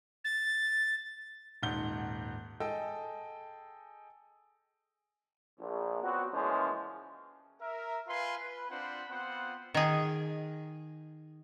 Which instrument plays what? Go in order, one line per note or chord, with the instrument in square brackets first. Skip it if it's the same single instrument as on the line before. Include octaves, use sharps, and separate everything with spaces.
[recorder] A6
[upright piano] D#1 G#2 F#5 G6 G7
G#4 A4 D#5 G5 E6
[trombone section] A#1
F#3 B3 C4 F#4
A#2 C#3 E3 F3 G#3 C#4
[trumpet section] A#4 E5
F4 B4 F5 G#5 C6
B4
C4 D4 F4 C5 F#5 B5
B3 C4 F4 C5 F#5
[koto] D#3 G#4